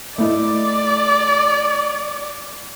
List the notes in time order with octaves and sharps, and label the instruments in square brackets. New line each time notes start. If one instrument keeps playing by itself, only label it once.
[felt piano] A3 E4 D#5 [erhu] D5